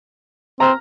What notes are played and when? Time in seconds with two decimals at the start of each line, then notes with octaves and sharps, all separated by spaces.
0.60 C4 A#5 F6